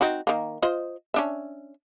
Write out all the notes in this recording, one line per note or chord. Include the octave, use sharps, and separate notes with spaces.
C4 D#4 F#4
D#3 A#3
F4 C5 D#5
C#4 D4 E5